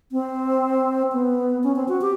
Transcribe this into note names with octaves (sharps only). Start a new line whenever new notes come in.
C4
B3
C#4
C4
F#4
G4